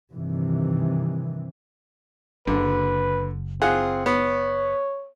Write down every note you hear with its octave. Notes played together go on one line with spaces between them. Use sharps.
G2 C3 D#3 E3
F#1 D3 B4
C4 F4 G#4 F#5
B3 C#5